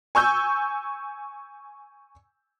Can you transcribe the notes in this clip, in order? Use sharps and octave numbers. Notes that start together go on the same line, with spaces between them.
G#5 C#6 E6 G6